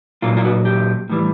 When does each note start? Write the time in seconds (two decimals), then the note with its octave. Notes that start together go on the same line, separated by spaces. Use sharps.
0.22 A#2 F#3 F4
0.37 F4
0.45 F#4
0.65 G4
1.10 A2 E3 G3